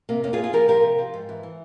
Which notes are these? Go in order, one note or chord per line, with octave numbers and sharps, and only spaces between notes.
C3 A#3
F2 A#3 C#4
F4 G#4
F2
F4 G#4
F3 G4 A#4
F3 G4 A#4
C3
F3
G#2
E3
E3